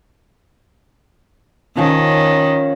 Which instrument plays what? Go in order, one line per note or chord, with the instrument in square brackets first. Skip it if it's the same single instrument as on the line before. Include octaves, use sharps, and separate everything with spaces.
[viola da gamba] D#3 [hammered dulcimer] F3 C#4